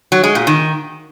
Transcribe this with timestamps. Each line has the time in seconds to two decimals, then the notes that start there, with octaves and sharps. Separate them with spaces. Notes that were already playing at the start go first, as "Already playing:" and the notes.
0.12 F#3
0.24 G#3
0.35 A#2
0.47 D#3